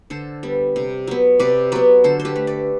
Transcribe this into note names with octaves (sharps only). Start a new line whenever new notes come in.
D3 A4 C5
G3 B3
C3
F#3 B3
C3 B4 D5
F#3 B3 B4 D5
D3 A4 C5
C5
G4 B4
A3
B4 D5